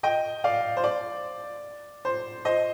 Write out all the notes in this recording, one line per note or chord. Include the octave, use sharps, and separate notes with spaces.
D#5 G5
D5 F5
C5
D5
C5
C5 D#5